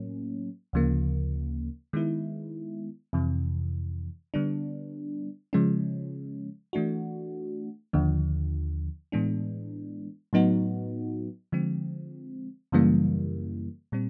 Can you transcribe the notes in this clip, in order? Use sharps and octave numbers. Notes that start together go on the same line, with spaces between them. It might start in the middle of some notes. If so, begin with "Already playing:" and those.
Already playing: A2 F#3 A#3 C#4
D2 C#3 F3 A#3
D#3 G#3 B3 E4
F2 C3 E3
D3 G3 B3 D4
C#3 F3 G#3 C#4
E3 A3 D4 F#4
D#2 D3 F3
A2 E3 G#3 B3 D4
A2 F#3 B3 D#4 F#4
D3 F3 G#3 C4
F#2 C#3 E3 G3 A#3
A#2 G3 C4